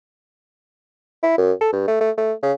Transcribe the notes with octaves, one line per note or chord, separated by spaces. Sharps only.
E4
F#2
A4
G2
A3
A3
A3
C#3